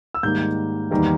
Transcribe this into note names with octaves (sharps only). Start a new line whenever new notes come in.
E6
G#2 D#3 G3 A#3 G6
E2 D#3 G3 A#3